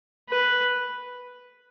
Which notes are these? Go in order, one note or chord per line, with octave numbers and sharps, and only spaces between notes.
B4